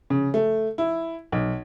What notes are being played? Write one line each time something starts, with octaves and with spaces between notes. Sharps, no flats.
C#3
A3
E4
B1